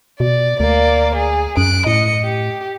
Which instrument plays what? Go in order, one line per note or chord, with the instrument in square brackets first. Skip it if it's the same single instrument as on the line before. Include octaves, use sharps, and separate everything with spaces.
[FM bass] B2 [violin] D5
[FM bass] D2 [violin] A#3 D5
[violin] G#4
[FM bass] F#2 [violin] F#6 D7
[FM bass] A2 [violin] D#5 C#7
[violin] G4